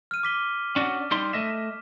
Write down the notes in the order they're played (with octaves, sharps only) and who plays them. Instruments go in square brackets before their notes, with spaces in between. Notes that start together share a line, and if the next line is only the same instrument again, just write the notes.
[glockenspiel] F6 D#7
D6 B6 G7
[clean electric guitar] C#4 D4 F#4
[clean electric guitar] G3 D#4 C6 [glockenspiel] B6
[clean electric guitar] A3 D#5 E5